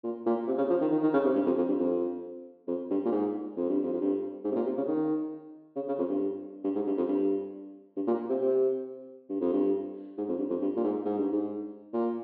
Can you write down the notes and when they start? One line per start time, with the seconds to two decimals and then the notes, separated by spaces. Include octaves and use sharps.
0.03 A#2
0.26 A#2
0.47 C3
0.58 C#3
0.69 F3
0.81 D#3
0.91 D#3
1.02 D#3
1.13 C#3
1.24 C3
1.35 G2
1.46 F2
1.57 F2
1.68 G2
1.79 F2
2.67 F2
2.90 G2
3.05 A#2
3.12 G#2
3.57 F2
3.69 G2
3.83 F2
3.93 F2
4.01 G2
4.44 G#2
4.51 C3
4.55 A#2
4.66 C3
4.77 C#3
4.88 D#3
5.76 C#3
5.88 C#3
5.98 F2
6.09 G2
6.64 G2
6.75 G#2
6.87 G2
6.97 F2
7.08 G2
7.96 G2
8.07 A#2
8.29 C3
8.41 C3
9.29 G2
9.41 F2
9.53 G2
10.18 G#2
10.28 F2
10.38 G2
10.50 F2
10.61 G2
10.76 A#2
10.84 G#2
11.05 G#2
11.18 G2
11.32 G#2
11.93 A#2